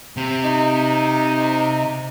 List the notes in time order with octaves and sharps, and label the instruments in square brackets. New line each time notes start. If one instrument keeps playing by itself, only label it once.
[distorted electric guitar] C3
[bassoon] D#4